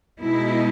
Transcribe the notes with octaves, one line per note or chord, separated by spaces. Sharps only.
B2 G#3 D#4 E4